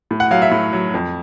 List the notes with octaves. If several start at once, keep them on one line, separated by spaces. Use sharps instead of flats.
A2
F#5
F#3 F5
E5
A2
F#3
F2